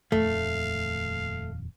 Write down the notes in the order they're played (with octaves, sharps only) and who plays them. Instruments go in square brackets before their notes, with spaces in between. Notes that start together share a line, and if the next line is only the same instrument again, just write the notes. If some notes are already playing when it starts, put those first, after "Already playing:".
[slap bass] D#1 F2 D#3 [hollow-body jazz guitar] A3 [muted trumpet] F5